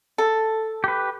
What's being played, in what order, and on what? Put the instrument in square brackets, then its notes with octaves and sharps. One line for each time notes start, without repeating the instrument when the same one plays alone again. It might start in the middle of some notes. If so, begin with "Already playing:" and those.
[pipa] A4
[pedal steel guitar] G4 B4